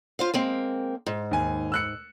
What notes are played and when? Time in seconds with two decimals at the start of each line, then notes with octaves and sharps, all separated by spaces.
0.19 F4 C5 F5
0.34 G#3 A#3 C4
1.06 G#2
1.31 D#2 G#5
1.72 E6 F#6 C#7